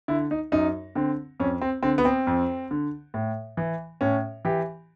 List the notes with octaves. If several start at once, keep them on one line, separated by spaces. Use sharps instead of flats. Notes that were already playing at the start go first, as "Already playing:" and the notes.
D3 E4
D#4
F#2 D#4
D3 C4
F2 C#4
C4
D3 C4
B3
C4
F2
D3
A2
E3
A2 C#4
E3 G4